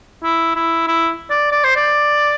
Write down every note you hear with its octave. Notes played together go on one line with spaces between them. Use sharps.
E4
E4
E4
D5
D5
C5
D5